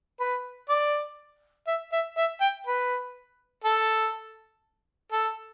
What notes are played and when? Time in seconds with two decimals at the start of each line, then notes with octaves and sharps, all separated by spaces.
0.20 B4
0.69 D5
1.68 E5
1.93 E5
2.18 E5
2.41 G5
2.67 B4
3.64 A4
5.12 A4